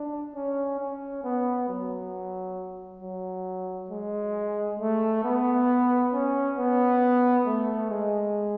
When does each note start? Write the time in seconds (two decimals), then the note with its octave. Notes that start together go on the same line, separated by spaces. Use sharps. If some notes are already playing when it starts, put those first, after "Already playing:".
Already playing: D4
0.35 C#4
0.80 C#4
1.24 B3
1.69 F#3
3.02 F#3
3.90 G#3
4.80 A3
5.24 B3
6.13 C#4
6.58 B3
7.46 A3
7.90 G#3